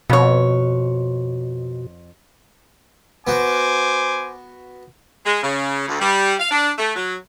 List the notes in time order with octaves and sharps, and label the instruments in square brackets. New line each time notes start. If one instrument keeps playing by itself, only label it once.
[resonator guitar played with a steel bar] F2 C#5 [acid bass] B2
[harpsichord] B3 F#4 [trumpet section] C5 G#5 D6
[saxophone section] G#3
C#3
D2
G3
F5
D4
A3
F#3